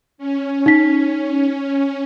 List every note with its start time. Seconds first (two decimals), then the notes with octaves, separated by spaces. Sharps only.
0.18 C#4
0.66 D#4 B6